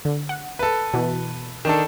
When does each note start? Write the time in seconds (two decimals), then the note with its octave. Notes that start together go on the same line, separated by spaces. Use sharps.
0.05 D3
0.29 F#5
0.59 A4 B4
0.94 B2 E3
1.65 D#3 D4 A4